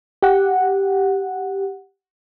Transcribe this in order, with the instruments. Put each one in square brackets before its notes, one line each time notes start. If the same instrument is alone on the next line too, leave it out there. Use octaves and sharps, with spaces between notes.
[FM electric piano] G4 F#5